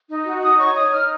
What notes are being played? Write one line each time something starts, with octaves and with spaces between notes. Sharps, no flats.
D#4
F#4
D#4 D#6
C#5 C#6
D#4 D#6
D#4 F6